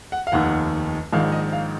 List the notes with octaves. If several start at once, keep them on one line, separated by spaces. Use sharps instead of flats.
F#5
F5
F1 D#2 D#3 F#5
A#1 G#2 D#3 F5
D#5
F5